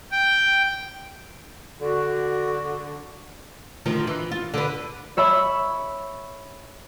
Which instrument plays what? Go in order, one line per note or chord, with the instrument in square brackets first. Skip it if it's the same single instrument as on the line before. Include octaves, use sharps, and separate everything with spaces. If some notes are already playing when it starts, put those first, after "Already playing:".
[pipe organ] G5
[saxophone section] D3 [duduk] F#4
[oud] D2 D#3 F3
E3
F4
D3 B4
[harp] C#5 E5 B5 C#6 E6